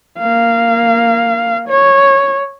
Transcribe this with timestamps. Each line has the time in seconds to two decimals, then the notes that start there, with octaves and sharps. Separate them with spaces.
0.18 A#3 F5
1.68 C#5